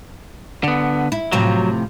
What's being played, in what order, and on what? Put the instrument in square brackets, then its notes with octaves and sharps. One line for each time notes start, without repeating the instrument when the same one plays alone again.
[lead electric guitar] D3 B3
[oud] E4
[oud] A2 C3 F3 [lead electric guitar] F#3